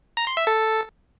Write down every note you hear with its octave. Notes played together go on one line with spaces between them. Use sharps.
A#5
C6
E5
A4